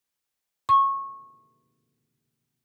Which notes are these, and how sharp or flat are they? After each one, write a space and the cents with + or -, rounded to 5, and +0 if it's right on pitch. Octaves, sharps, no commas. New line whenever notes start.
C#6 -20